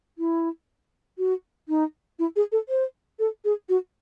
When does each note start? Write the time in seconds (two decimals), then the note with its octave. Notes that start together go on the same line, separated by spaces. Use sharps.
0.18 E4
1.18 F#4
1.68 D#4
2.19 E4
2.36 G#4
2.52 A4
2.69 C5
3.19 A4
3.44 G#4
3.69 F#4